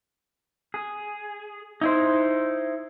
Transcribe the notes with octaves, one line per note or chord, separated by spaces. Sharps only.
G#4
D#4 E4 C5